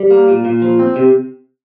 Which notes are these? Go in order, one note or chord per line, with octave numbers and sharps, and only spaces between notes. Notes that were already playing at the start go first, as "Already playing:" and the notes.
Already playing: G3
A#3
A#2
A#2
F3
C4
C3